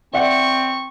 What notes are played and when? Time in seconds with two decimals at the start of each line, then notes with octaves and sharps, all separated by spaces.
0.13 C4 D5 E5 F#5 C#6